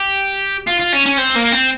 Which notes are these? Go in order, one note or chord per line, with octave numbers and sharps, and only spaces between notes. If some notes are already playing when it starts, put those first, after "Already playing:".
Already playing: G4
F4
F4
C#4
C#4
C4
A#3
C4